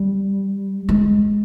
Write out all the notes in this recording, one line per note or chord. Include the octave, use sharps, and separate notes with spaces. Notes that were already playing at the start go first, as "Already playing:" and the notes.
Already playing: G3
G#3